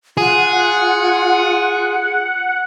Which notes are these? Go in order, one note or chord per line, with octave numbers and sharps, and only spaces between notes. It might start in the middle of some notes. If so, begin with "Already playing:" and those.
F4 G#4 F#5